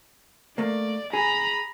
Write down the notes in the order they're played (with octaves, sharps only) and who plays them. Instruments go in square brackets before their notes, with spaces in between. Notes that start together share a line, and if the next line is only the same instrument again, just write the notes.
[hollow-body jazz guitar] A3 A#3 [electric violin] D5
[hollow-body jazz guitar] G#4 [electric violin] A#5 B5